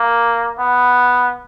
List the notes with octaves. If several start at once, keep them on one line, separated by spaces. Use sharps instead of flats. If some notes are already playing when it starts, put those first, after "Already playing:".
Already playing: A#3
B3